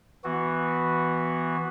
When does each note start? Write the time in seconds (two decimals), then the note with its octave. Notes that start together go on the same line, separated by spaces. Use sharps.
0.24 E3 B3 F#4